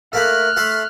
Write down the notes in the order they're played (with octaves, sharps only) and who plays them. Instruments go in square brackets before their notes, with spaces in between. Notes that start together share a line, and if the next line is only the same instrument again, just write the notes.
[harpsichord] A3 A#3 B5 [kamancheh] F6 F#6
[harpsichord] A3 E5 C6